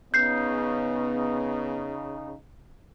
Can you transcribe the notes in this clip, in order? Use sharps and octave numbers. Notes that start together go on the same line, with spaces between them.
C#3 B3 D#4 G6 C7